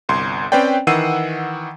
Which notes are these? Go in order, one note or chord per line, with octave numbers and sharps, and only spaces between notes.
G1 C2 C6
C4 C#4 B4 C5 D5 G5
D#3 E3 F#5 E6 C7 D#7